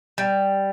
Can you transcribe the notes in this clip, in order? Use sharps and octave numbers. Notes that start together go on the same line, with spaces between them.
G3